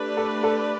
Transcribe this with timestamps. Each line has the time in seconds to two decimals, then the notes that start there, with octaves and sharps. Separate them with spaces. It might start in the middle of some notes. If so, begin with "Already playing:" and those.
Already playing: A3 D4 G4 B4 D5
0.17 A4
0.44 A4